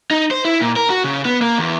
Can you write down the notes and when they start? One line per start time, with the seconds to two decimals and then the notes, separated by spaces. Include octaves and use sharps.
0.11 D#4
0.31 C5
0.45 E4
0.61 A#2
0.76 A#4
0.90 F#4
1.04 C#3
1.25 B3
1.42 A#3
1.58 E2